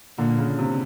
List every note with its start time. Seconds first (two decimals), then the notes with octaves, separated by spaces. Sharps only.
0.18 A#2 D3
0.39 C#3
0.59 C3